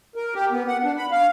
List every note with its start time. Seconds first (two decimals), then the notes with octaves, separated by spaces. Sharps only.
0.15 A#4
0.35 G4
0.51 B3
0.67 F#5
0.84 D4
0.97 B5
1.11 F5